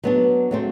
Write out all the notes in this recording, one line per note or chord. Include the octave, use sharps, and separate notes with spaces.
F#3 B3 D4
F#3 A3 C4